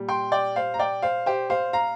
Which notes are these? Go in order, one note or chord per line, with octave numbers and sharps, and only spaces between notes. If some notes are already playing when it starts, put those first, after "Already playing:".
Already playing: A#2 G3
G5 C6
D5 G5
C5 F5
A#5
D5 G5
C5 F5
G4 C5
C5 F5
F5 A#5